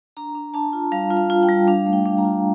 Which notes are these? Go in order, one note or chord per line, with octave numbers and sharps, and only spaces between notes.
D4 A#5
D4
D4 A5
F4
G3 F5
F4
F5
F4
G5
G3
D4 F5
A3
G5
D4
A#5
F4